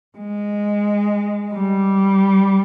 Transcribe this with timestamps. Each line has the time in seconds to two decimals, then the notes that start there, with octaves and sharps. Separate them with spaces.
0.18 G#3
1.53 G3